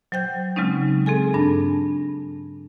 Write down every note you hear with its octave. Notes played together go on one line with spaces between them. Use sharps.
F#3 C5 G5 G6
C#3 F#3 G#3 C4 C#4 D#4
C4 G#4 A4 G#5
G2 D4 A5